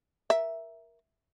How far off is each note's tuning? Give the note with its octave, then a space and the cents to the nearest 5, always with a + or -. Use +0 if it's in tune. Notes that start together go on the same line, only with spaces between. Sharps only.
A#4 +15 E5 +0